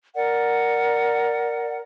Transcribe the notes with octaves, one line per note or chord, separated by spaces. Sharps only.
A#4 D5 F#5